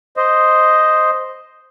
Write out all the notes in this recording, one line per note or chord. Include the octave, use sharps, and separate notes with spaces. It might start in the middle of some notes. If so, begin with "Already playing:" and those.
C5 D#5